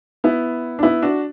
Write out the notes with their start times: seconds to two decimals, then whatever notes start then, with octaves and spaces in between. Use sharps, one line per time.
0.24 B3 E4
0.79 D4
0.83 B3 E4
1.02 D4 F#4